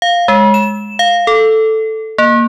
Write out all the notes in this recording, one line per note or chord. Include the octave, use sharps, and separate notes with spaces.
F5
G#3
E7
F5
A4
A#3